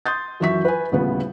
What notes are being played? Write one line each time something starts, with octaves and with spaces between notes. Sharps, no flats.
C6 D#6 G6 A6
F#2 E3 F#3 E5 C#6 B6
B4 G#5
D#1 D2 A2 C#3 B3